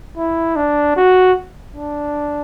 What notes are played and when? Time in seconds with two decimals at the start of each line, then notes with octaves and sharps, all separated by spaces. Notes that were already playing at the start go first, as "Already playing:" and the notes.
0.17 E4
0.56 D4
0.96 F#4
1.76 D4